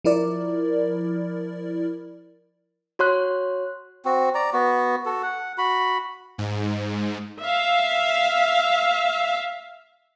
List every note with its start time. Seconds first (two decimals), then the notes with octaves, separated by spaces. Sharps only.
0.04 F3 E4 A#4 D5
2.99 F#4 C#5 C6 F#6
4.05 C4 F#4
4.35 D5 A#5
4.53 B3 F#4
5.06 F#4 A4
5.23 F#5
5.58 F#4 B5
6.38 G#2
7.42 E5 F5